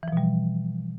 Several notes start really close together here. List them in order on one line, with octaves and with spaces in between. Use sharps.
E3 F3 B2 G3